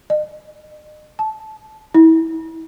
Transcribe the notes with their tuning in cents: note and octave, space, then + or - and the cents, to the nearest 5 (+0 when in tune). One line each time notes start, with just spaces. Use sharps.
D#5 -40
A5 -15
E4 -30